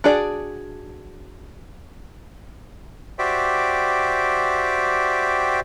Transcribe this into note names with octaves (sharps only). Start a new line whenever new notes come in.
D4 F#4 G#4 D5
F#4 G4 C5 D5 E5 G5